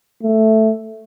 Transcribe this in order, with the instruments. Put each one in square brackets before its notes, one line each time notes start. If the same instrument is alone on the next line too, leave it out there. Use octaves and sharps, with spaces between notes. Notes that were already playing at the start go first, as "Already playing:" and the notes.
[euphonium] A3